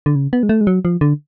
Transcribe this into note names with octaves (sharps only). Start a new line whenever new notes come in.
D3
C#3
B3
G#3
A3
G#3
F#3
F3
D3